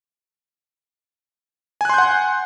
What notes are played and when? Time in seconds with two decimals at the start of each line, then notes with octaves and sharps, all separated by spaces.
1.81 G#5
1.85 F#6
1.90 C6
1.94 G6
1.98 F#5